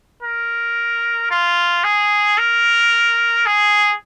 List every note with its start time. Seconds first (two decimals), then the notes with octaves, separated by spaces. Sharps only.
0.23 A#4
1.31 F4
1.84 G#4
2.38 A#4
3.46 G#4